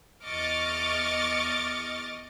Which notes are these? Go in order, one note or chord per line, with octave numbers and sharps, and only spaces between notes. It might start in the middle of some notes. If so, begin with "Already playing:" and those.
E2 D#5 C#6 D6 F6 A6